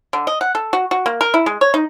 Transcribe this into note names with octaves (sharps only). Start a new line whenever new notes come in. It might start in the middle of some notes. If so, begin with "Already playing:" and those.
D3
D#5
F#5
A4
F#4
F#4
A#3
A#4
E4
G#3
C#5
D#4